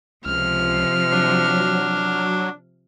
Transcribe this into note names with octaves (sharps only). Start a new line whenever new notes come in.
C#2 C3 F3 F6
F#3 D4